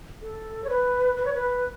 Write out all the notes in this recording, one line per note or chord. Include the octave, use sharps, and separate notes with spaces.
A4
C#5
B4
B4
C#5
B4